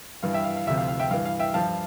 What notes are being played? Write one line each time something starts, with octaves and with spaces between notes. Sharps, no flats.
G2 E3 F5
E5 G5
F5
F5
D2 C3 F3 E5
F5
F5
E5 G5
G2 E3 F5
F5
E5 G5
G2 F3 F5 A5